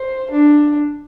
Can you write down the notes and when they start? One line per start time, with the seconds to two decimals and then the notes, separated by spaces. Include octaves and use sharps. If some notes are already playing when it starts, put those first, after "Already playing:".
Already playing: C5
0.31 D4